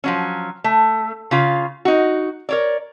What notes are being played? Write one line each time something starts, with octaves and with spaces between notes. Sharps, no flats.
F3 F#3 C#4
A3
C#3 F4 F5
D#4 F#4
A#4 C#5 D5